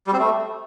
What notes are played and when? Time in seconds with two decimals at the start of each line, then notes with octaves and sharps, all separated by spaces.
0.07 G3
0.13 C4
0.19 A3